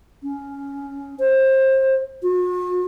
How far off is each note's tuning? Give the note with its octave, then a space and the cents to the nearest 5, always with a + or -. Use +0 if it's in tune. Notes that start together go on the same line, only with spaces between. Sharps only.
C#4 +10
C5 +25
F#4 -45